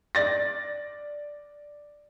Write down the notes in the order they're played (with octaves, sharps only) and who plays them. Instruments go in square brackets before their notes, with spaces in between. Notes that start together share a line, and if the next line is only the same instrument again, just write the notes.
[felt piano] D5 A6 A#6